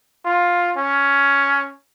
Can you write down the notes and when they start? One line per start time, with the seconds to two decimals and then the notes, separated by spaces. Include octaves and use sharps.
0.25 F4
0.77 C#4